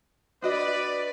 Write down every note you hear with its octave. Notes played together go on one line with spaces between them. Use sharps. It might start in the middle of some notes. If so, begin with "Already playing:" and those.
D4 F#4 B4 D5 D#5